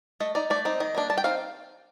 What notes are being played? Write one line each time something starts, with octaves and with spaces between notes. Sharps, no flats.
A3 D#5
D#4 D5
A3 D5
C4 D#4
D#3 D#5
G3 A#3 D4
G3 A5
G5
C4 D#4 F5